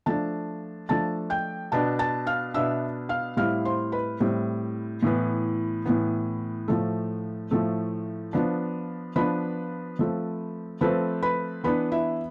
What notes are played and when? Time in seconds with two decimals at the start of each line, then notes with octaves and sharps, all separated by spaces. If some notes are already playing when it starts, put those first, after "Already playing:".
0.06 F3 A3 D4 A5 A6
0.89 F3 A3 D4 A5 A6
1.30 G5 G6
1.72 B2 B3 D4 A5 A6
1.99 A5 A6
2.26 F5 F6
2.54 B2 B3 D4 E5 E6
3.09 F5 F6
3.37 A2 G3 C4 E4 F5 F6
3.65 C5 C6
3.92 B4 B5
4.20 A2 G3 C4 E4
5.03 A2 E3 B3
5.85 A2 E3 B3
6.68 A2 F3 A3
7.51 A2 F3 A3
8.33 F3 B3 D4
9.16 F3 B3 D4 B4 B5
9.99 F3 A3 C4
10.81 F3 A3 C4 B4 B5
11.22 B4 B5
11.64 E3 B3 D4 B4 B5
11.92 E4 E5